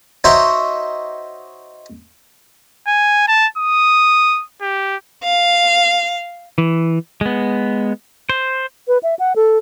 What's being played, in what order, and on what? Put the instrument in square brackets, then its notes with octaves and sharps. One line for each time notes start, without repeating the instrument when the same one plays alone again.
[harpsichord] D#4 F#4 C5 C#5 E5
[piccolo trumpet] G#5
A5
D#6
G4
[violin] F5
[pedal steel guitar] E3
G#3 B3
C5
[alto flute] B4
E5
F#5
A4